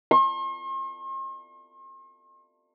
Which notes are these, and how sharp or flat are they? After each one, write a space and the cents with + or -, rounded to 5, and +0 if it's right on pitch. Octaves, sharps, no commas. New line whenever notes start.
C6 +45